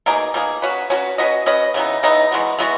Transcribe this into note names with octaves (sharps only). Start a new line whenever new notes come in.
B2 A#3 D#4 G#4
B2 A#3 D#4 G#4
C#4 F#4 B4
C#4 F#4 B4
C#4 F#4 B4 D#5
C#4 F#4 B4 D#5
C#3 E3 B3 D#4
C#3 E3 B3 D#4
E3 G#3 B3 F#4
E3 G#3 B3 F#4